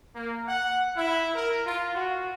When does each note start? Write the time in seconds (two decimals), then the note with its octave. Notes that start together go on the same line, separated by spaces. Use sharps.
0.16 A#3
0.48 F#5
0.96 E4
1.34 A#4
1.65 F4
1.94 F#4